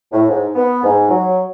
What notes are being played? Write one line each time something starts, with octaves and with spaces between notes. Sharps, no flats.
A2
G#2
B3
G#2
F#3